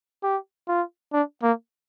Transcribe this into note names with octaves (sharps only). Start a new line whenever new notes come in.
G4
F4
D4
A#3